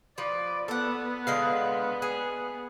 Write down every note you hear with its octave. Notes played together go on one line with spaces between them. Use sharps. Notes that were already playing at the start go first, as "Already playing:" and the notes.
F3 B4 D5
B3 A4 F#5
D3 G#3 F5
G#4